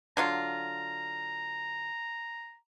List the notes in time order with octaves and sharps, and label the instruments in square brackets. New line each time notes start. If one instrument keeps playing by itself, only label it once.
[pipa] D3 F#3 F4 [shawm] A#5